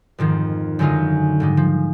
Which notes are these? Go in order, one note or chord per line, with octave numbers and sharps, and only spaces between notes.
F2 G#2 D#3 F3
F#2 D3 G#3 D#4 F4
G#2 G3 G#3
F3